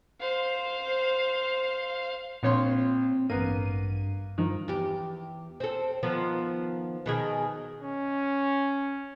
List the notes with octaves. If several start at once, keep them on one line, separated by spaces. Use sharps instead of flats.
C5 F5
A#1 A#2 C4 C#5 C6
A1 G2 A#3 B3 D#7
G2 D#3 F3
E2 G4
C4 A4
D#3 F3 B3
B2 D#3 G#4
C#4